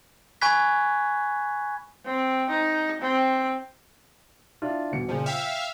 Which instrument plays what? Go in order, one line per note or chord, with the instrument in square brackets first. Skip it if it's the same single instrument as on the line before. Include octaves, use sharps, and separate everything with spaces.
[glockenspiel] G#5 B5 C#6 F#6 G#6 B6
[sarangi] C4
D#4
C4
[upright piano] D4 E4 F4
D#1 B2 C#7
[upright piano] A#2 C#3 [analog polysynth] F3
[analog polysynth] E5 F5 [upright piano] G5